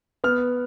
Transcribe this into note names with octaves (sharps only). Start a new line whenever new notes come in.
B3 F6